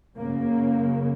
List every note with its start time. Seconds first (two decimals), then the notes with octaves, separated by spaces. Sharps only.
0.17 F#2 C#3 A#3